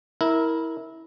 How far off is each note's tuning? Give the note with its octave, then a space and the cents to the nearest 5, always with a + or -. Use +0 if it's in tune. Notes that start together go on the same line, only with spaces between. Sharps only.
E4 -20 A#4 +0